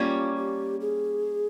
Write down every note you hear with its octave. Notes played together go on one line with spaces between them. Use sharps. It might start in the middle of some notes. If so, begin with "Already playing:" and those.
Already playing: G3 A#3 C#4 F4
G4
G#4